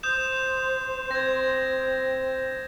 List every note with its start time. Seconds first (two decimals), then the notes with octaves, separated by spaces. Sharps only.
0.03 C5 D#6 G6 E7
1.11 C4 G#6 A#6